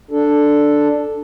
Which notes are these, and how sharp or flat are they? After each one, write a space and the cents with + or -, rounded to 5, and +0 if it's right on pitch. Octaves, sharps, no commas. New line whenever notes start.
D4 +0 A4 +0